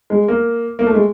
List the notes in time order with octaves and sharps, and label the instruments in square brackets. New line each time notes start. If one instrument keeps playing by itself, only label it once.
[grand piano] G#3
A#3
A#3
A3
G#3